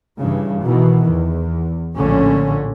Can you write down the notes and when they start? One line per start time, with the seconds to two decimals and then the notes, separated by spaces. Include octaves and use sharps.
0.18 G2 C#3 E3
0.64 B2 D#3 E3
1.13 E2
1.97 A#1 A2 D3 C#4